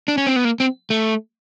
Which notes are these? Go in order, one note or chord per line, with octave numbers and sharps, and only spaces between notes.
D4
C#4
C4
B3
A#3
C4
A3